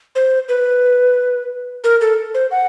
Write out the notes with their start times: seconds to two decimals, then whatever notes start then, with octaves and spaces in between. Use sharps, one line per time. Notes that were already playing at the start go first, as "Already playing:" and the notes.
0.15 C5
0.49 B4
1.84 A#4
2.01 A4
2.34 C5
2.51 F#5